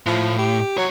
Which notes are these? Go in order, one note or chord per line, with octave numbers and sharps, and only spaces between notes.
A2 F3
G4
C2 F#3 C#5